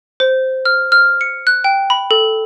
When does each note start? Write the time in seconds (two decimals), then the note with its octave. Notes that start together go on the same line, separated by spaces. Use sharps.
0.20 C5
0.65 F6
0.92 F6
1.21 C#7
1.47 F#6
1.64 G5
1.90 B5
2.11 A4